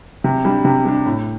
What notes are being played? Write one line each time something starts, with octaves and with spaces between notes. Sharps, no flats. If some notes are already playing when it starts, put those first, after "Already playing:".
C3
G3 D4
C3
G3 D4
A2